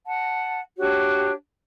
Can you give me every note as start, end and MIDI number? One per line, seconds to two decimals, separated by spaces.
0.05 0.59 78
0.05 0.59 81
0.78 1.32 62
0.78 1.32 66
0.78 1.32 67
0.78 1.32 73